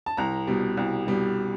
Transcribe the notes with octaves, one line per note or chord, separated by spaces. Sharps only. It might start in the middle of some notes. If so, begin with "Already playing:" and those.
A5
C2 A#5
B2 G3
C2
B2 G3